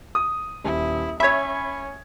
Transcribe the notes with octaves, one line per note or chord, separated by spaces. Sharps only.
D#6
D#1 E4
C#4 C#5 E5 B5 G#6